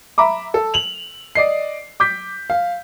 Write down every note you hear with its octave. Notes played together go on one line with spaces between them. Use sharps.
E5 A#5 B5 D6
A4
F7 F#7
D5 D#5 C7
D6 G6 B6
F5